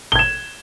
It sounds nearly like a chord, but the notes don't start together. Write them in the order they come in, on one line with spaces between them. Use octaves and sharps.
G7 G#6 E7